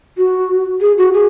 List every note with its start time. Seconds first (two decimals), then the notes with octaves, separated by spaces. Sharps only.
0.18 F#4
0.81 G#4
0.98 F#4
1.14 G#4